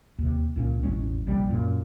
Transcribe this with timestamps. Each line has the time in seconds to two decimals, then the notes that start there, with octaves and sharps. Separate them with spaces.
0.18 D#2 C3
0.56 C#2 A#2 C#4
0.83 E1 A1 G#3 C#4
1.27 A#1 C3 G3
1.49 F#2 A#2